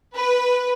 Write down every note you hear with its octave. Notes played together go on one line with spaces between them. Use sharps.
B4